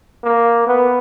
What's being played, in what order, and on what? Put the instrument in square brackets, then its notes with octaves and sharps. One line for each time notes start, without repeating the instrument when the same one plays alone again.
[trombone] A#3
B3